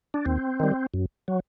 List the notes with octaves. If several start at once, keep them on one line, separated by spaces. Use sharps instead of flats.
D4
D#2 C4
D#3 G3
F#2
F#3